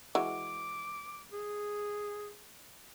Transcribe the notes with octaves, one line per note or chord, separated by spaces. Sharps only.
E3 G#3 F#4 D6
G#4